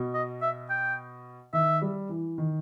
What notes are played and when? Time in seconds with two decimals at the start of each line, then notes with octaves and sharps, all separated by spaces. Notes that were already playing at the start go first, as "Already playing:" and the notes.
Already playing: B2
0.14 D#5
0.42 E5
0.70 G5
1.53 D#3 E5
1.82 G3
2.09 E3
2.38 D#3